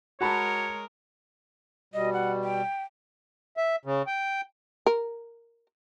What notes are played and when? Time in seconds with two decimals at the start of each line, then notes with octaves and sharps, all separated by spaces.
0.21 G#3 F#4 A#4 C#5 A5 B5
1.94 B2 G3 D#5
2.13 F#5
2.43 G5
3.57 E5
3.85 C#3
4.07 G5
4.86 A#4